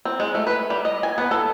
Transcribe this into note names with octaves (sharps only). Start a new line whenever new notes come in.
C4
G#3
A3
B4
G3
D#5
G#5
B3
A4